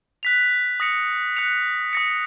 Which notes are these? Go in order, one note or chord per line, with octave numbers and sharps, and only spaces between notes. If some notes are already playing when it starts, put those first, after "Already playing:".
F#6 B6 F7
D#6 A#6 C#7 F7
F#6 C#7 F7
D#6 A#6 C#7